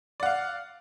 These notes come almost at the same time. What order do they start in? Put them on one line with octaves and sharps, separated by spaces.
D5 F#5 F5